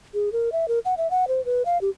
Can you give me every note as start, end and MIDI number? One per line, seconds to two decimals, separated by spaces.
0.14 0.32 68
0.32 0.50 70
0.52 0.68 76
0.68 0.79 70
0.85 0.94 78
0.98 1.10 76
1.11 1.28 78
1.28 1.44 72
1.45 1.62 71
1.65 1.80 77
1.81 1.90 67